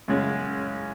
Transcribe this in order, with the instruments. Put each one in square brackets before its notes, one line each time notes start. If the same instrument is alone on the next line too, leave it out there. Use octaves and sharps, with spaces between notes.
[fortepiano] F#2 C#3 G#3 C#4